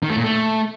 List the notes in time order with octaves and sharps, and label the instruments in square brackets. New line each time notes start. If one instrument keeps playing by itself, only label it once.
[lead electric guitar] D#3
A3
A#2
A3